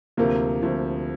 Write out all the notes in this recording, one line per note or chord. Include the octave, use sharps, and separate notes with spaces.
D2 C3 F3 A#3
D2 C3 F3